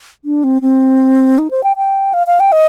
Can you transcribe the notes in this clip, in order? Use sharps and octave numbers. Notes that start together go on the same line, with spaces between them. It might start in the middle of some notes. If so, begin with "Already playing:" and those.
D4
C4
C4
D#4
C5
G5
G5
F5
F5
G5
D#5